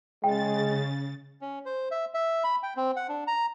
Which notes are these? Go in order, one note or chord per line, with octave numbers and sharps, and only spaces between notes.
C#3 G#3 G5 A6
C#4
C5
E5
E5
B5
G5
C4
F#5
D4
A#5